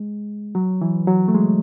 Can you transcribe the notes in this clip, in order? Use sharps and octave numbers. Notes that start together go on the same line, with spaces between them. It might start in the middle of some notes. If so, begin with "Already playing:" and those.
Already playing: G#3
F#3
E3
F#3
A3
G#3